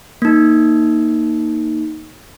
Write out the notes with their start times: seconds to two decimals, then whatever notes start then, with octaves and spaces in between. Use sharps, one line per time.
0.22 A#3 D#4